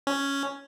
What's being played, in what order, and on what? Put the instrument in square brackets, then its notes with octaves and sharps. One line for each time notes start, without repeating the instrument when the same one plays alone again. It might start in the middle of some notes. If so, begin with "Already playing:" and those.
[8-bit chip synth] C#4